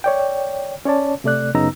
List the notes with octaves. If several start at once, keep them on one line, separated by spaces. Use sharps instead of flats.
C#5 D5 G5
C#4 C#5 D5 A5
C3 A3 D5 F#6
F#2 C#3 B3 D#4 A#5 E6